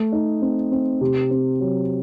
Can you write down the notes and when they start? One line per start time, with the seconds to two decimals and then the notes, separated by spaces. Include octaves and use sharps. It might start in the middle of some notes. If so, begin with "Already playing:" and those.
Already playing: A3
0.12 D#4
0.42 C4
0.72 C4
1.01 C3
1.31 C4
1.60 F#3